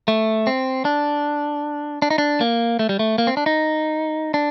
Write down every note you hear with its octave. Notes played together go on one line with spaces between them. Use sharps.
A3
C4
D4
D4
D#4
D4
A#3
A3
G3
A3
A#3
C4
D4
D#4
D4